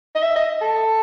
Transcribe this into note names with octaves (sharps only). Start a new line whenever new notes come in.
D#5
E5
D#5
A4